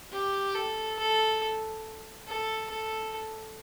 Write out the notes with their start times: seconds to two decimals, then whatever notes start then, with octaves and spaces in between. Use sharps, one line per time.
0.12 G4
0.55 A4
0.99 A4
2.28 A4
2.70 A4